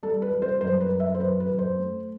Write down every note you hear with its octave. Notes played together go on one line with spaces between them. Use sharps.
G3 A4
B4
G3
C5
F#2 C5
B4
F#2
E5
C5
F#3 B4
B4
F#2
C5
A3